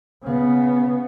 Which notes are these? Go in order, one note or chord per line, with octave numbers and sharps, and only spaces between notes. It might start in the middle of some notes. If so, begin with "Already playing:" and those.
C#3 B3